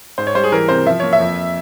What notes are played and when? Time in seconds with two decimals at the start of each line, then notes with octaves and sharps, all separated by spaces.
0.18 G#2 C5
0.27 C#5
0.35 G3 C5
0.44 G#4
0.52 E3 A#4
0.69 C3 C5
0.86 F3 E5
1.00 A#3 C#5
1.13 E5
1.20 F2